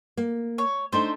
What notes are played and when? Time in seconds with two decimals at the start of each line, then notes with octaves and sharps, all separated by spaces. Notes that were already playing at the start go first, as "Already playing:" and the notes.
0.17 A#3
0.58 C#5
0.93 A3 D4 D#4 C5